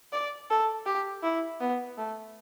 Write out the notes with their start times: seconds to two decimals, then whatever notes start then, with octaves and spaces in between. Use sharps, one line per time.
0.12 D5
0.50 A4
0.86 G4
1.23 E4
1.60 B3
1.97 A3